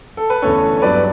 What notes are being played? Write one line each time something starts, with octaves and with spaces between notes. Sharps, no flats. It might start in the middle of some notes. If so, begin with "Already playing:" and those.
A4
B4
E2 D3 A3 C#4 A4 C#5
C#5
G2 F#3 B3 D4 B4 D5